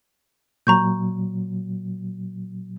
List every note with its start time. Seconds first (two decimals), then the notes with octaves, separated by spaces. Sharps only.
0.67 A#2 F#3 A#5 C#6 G6